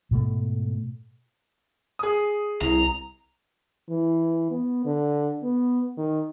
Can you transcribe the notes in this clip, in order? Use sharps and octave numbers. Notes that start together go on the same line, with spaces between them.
G#2 B2 A3
G#4 D#6
C2 E4 A#5
E3
B3
D3
B3
D#3